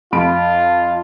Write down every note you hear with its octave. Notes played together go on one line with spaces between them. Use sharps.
F2 F4 B5 D7